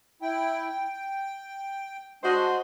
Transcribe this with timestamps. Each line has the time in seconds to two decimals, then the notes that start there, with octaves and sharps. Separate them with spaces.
0.22 E4 G5
0.68 G5
2.24 G#3 D4 F#4 C5 D#5